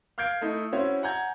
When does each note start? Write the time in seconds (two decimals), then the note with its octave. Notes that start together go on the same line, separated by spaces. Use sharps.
0.18 F5 F6 G6 G#6 C7 D7
0.41 A3 D#4 E4
0.73 C#4 E4 F#4 C5 C#5
1.03 F#5 G#5 A#5 G6 G#6